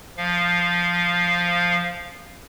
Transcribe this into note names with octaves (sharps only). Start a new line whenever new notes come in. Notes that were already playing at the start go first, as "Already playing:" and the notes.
F3 F5